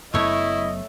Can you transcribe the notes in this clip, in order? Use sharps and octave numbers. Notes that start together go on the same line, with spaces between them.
F#1 F#2 A3 B3 E4 C#5 D#5